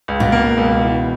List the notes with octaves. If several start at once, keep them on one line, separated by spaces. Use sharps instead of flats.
C#2
B2
A#3
C#2
E3